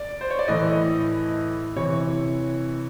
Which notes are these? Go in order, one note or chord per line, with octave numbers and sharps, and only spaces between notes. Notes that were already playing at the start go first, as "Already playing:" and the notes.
Already playing: D5
C5
C#5
D5
A2 E3 D#5
C3 E3 C#5